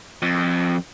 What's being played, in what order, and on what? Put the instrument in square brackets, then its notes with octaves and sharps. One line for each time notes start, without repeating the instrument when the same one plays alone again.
[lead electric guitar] F2